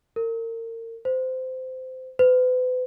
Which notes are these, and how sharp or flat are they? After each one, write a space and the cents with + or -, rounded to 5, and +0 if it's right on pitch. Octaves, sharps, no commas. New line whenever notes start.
A#4 -35
C5 -20
B4 +40